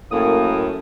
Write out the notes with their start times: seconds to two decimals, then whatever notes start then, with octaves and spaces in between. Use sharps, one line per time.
0.11 F#2 A2 A#3 D#6